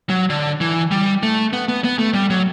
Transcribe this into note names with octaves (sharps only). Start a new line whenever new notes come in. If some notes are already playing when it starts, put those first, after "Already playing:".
F#3
D3
E3
G3
A3
B3
B3
B3
A3
G3
F#3